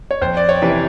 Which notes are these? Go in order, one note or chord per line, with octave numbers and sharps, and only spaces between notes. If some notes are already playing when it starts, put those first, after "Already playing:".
C#5
F2 C5
D5
C#5
C3 E3